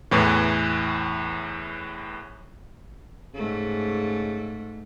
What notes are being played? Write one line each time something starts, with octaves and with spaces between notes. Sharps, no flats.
E2 A2 E3
G#2 C#3 A3